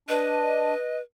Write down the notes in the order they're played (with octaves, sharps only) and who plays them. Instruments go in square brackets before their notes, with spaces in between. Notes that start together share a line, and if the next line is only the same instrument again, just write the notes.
[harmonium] D4 [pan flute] B4 [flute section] D#5